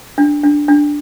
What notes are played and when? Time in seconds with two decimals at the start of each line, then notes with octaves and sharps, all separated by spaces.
0.18 D4
0.43 D4
0.68 D4